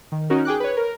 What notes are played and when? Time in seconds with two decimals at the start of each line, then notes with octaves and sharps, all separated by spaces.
0.12 D#3
0.30 C#4 D#4 F#4 A#4
0.45 G#4 G5 D6 F#6
0.60 B4 C#5
0.77 A#4